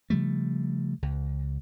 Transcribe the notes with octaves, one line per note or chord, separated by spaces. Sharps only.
C#3 F3 G3 A3
C#2